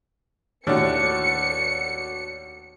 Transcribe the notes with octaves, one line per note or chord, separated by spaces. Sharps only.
D#2 A2 A3 D4 F#4 C#5 C#7